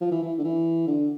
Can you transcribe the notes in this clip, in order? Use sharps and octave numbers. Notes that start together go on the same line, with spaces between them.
F3
E3
E3
D3
E3
D3